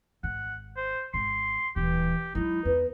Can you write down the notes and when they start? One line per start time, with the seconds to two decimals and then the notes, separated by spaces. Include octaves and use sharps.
0.23 G#1 F#5
0.77 C5
1.14 G#1 C6
1.76 D#1 E3 G4
2.35 F#3 G#3 D#4 E4
2.65 E2 B4